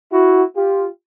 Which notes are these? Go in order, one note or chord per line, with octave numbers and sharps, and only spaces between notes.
E4 F#4
F4 G4